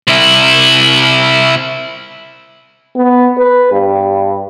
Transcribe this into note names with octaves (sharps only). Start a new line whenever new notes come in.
C3 E4
B3
B4
G2